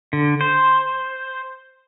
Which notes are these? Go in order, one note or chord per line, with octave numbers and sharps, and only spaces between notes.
D3
C5